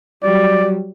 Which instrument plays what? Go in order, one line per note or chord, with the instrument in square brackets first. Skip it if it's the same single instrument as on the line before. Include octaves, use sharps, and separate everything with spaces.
[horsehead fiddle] F#3 G3 [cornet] D5